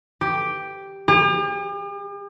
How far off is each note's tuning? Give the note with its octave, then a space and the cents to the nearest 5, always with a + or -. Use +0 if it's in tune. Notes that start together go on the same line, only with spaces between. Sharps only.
G4 +0
G4 +45